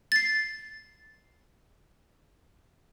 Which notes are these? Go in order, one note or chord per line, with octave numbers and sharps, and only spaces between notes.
A6 C7